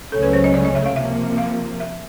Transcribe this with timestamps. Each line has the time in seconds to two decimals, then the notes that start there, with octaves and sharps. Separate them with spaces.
0.12 C#2 C#3 F#3 A3 C#4 A4
0.23 B4
0.33 C5
0.44 D#5
0.54 D5
0.65 D#5
0.75 E5
0.86 F5
0.96 C3 F3 A#3 E5
1.38 F5
1.80 E5